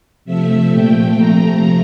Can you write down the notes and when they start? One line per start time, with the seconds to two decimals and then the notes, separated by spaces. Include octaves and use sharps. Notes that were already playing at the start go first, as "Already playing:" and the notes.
0.25 C3 F3 A3 E5
0.71 A#2 F3 A3 G5
1.16 C3 F3 A3 A#5